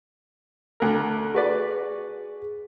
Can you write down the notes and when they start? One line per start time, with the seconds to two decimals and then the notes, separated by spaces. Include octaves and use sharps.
0.80 D2 A#4
1.35 F#4 G#4 B4 D5